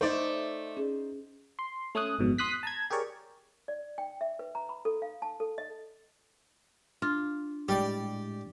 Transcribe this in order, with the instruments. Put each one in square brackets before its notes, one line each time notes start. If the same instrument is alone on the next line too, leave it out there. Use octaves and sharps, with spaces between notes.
[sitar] A3 D5 [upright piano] D#4 C5
[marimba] C#4 G#4
[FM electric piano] C6
A3 C#4 G#5 D#6 F#6
G#1 F2 G#2 B2 F#3
C6 D#6 F#6 B6
A5 A#5 G#6
G4 G#4 A#4 C#5 D5
[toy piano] D5
G5
E5
B4
A#5
B5
A4
F5
A5
A4
D#5
[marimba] D4 [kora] F4
[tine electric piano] A2 G#3 [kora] G3 [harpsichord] G4 D5